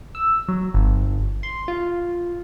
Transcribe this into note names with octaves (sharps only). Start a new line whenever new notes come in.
E6
F#3
G1
C6
F4